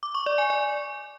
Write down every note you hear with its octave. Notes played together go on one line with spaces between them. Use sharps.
D6
C#6
D5
G#5
D5